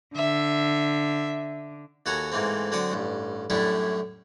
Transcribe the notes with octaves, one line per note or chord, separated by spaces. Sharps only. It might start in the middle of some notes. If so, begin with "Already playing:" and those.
D3 E5
D#2 F#4 A4 F#5 G#5 A#5
G#2 E3 A3 A#3 C4
D3 F#3 C4 F#4 D6 D#6
A1 G2
F#2 A2 G3 A3 D4 E4